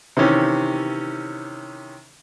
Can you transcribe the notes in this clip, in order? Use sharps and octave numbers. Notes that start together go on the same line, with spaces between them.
C3 D#3 E3 C#4 G4